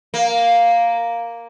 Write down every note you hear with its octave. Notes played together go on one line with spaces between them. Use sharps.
A#3